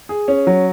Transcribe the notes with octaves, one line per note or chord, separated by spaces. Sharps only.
G#4
C#4
F#3